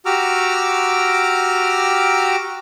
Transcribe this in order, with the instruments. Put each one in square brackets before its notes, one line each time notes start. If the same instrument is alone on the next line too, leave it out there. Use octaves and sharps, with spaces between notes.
[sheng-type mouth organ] F#4 G4 A#5 D6 E6 F6